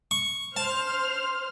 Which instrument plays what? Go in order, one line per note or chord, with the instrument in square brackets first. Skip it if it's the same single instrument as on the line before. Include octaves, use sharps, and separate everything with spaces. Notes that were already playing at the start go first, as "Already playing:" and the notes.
[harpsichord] C#6
[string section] C5 F6 [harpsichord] A5